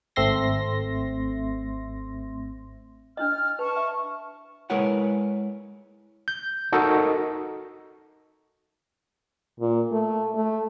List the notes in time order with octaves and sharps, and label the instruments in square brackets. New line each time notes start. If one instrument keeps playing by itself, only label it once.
[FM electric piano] G#1 A3 C4 E5 C6 A#6
[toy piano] D4 E4 D#5 [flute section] F6
[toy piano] B4 [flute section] A5 C#6
[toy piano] E5
[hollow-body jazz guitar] G#3 E4 A#4 B4 C#5 F#5
[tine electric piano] G6
D#4 F#4 A4 A#4 D#5
[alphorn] A#2
A3
A3